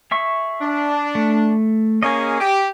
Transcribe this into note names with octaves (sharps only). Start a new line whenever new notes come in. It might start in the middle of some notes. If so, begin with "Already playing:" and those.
G#4 E5 C#6
D4
A3
A#3 C#4 G#4 D#5 G#5
G4